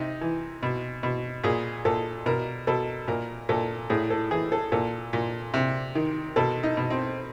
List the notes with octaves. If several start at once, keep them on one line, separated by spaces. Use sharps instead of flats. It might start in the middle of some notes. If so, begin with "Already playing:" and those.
Already playing: C3 D#4
E3
B2
B2
A#2 G#4
A#2 A4
B2 A#4
B2 A4
A#2 A#4
A#2 A4
A2 G#4
A4
E3 G#4
A4
A#2 A4
A#2
C3
D#3
B2 A4
D#4
B2
C4